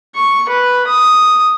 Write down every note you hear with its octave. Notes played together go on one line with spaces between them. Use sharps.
C#6
B4
D#6